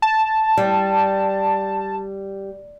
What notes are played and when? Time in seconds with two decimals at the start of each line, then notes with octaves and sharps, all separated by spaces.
0.02 A5
0.57 G3